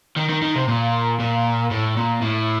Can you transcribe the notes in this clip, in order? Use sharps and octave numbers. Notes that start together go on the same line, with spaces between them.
D#3
D#3
D#3
C3
A#2
A#2
A2
A#2
A2